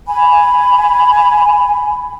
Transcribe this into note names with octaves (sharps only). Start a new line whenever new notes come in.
G#5 B5